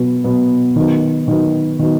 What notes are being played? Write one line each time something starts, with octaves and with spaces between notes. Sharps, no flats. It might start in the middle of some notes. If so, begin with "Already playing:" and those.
Already playing: B2 F#3 B3
B2 F#3 B3
D#3 F#3 B3
D#3 F#3 B3
D#3 F#3 B3